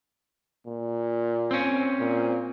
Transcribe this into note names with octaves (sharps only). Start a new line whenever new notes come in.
A#2
C4 C#4
A#2